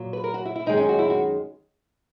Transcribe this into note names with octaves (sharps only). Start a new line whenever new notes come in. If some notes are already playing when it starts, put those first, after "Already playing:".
Already playing: A#2 F#3
B4
A#4
F#4
E4
E4
F#2 D#3 G#3 D#4
C#4
F#4
E4
F#4